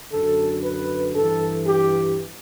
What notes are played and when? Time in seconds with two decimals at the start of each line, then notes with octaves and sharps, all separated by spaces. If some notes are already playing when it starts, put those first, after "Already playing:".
0.11 F#2 D3 A4
0.62 B4
1.15 G2 E3 A4
1.67 G4